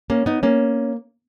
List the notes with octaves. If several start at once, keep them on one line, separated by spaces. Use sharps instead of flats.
A#3 C#4
B3 D#4
A#3 C#4